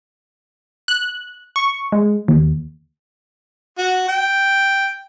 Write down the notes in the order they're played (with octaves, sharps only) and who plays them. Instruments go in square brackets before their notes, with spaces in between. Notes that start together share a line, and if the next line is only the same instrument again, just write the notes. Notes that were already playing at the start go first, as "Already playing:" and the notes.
[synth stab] F#6
C#6
G#3
D#2
[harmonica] F#4
G5